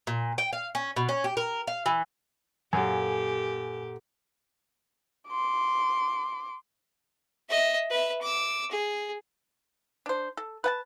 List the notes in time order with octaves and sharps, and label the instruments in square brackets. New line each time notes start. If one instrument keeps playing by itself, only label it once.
[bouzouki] A#2
G5
F5
C#4
B2
C#4
G4
A#4
F5
E3
[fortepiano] F#2 [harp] A#2 A4 [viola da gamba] G4 [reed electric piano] G#5
[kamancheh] C6 D6
[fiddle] D#5 E5
B4 E5
D6 E6
G#4
[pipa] D4 C5
A4
B4 F#5 A5